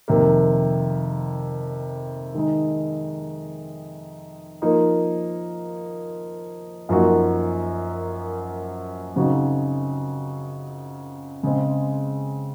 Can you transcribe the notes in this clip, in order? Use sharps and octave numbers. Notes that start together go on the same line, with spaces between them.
F2 C3 D#3 A#3
D#3 G#3 D#4
F3 A#3 D#4
F#2 F3 A#3 D#4 F#4
C#3 F#3 C4 D#4 F#4
C#3 G#3 C4